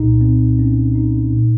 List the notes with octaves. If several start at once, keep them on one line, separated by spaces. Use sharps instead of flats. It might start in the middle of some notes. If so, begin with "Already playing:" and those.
Already playing: C2 A#2 D#4
C4
C#4
D#4
A#2